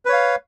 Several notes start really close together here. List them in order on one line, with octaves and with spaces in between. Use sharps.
B4 C#5 F5